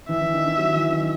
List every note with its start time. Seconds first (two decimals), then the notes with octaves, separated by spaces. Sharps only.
0.09 E3 E5
0.21 E3
0.34 D#3
0.46 D#3
0.58 F#3
0.75 E3
0.90 D#3